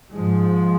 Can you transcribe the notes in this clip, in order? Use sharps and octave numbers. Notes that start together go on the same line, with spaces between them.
G#2 F3 G#3